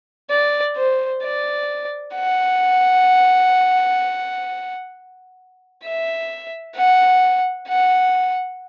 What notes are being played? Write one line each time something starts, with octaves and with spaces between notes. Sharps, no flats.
D5
C5
D5
F#5
E5
F#5
F#5